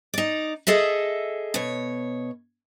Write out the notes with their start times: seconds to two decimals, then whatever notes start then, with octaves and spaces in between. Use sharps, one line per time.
0.14 D#4 D5
0.67 G#4 A4 D#5 E5
1.54 B2 C#5